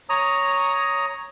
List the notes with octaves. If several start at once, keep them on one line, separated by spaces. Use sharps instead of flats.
C#5 A#5 D#6